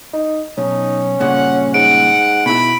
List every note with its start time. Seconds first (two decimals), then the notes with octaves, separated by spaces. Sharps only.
0.13 D#4
0.58 B1 C#4 D#4
1.20 G2 A#2 C#3 F#5
1.74 G#2 F#5 D7
2.46 B2 E4 B5